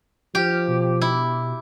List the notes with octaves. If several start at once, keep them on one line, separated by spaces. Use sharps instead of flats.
F3 G4 F6
B2
E4